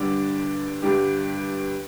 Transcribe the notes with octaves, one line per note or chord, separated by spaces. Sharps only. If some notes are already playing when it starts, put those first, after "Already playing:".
Already playing: G2 D3 G3 D4
G2 D3 G3 D4 G4